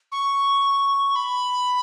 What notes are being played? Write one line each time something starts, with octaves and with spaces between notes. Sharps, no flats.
C#6
B5